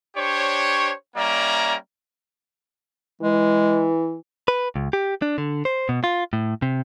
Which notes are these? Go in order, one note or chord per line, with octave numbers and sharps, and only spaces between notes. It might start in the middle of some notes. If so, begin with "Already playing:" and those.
D4 G4 C5 C#5
G3 A#3 C#4 D5 E5 A#5
E3 G#3
B4
C#2
G4
D4
D3
C5
B2
F4
A2
C3